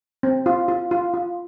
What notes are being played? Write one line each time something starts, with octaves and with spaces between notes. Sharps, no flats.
C4
F4
F4
F4
F4